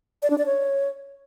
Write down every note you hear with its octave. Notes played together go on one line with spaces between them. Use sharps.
D5
D4
D5
C#5